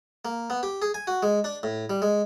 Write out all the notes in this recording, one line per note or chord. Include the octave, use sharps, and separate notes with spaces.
A#3
B3
G4
G#4
G#5
F#4
G#3
D4
A2
G3
G#3